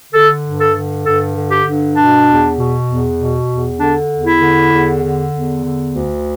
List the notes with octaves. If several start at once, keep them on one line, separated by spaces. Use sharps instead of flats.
D3 A4
G2
A4
D3
G2 A4
D3
G4
G2
B2 D4
E2
B2
E2
B2
E2
D3 D4
E2
E4
D3
E2
D3
E2
D3
D2